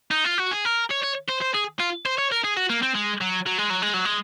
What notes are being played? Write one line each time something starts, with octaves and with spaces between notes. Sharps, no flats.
D#4
F4
F#4
G#4
A#4
C#5
C#5
C5
C5
G#4
F4
C5
C#5
A#4
G#4
F#4
A#3
C4
G#3
F#3
F#3
G#3
F#3
G#3
F#3
G#3